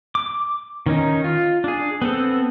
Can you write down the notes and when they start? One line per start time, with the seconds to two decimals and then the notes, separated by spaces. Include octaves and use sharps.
0.15 D6
0.86 D#3 C#4 D#4
1.24 F4
1.64 D4 G#4
2.02 B3 C4 A4